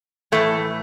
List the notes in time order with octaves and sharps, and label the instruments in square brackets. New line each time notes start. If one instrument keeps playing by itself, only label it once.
[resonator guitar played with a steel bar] A2 E3 A3